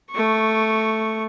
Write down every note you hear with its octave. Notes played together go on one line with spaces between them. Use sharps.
A3 C#6